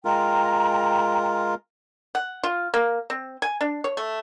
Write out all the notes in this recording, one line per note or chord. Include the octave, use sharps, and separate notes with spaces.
G#3 F4 A#4 G5 A#5
F#5
F4
A#3
C4
G#5
D4
C#5
A3